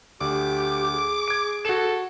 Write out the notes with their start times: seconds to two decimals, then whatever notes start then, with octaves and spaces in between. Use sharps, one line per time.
0.21 D2 G4 D6
0.93 G#4
1.28 G#6 D7
1.65 F#4 A4 E7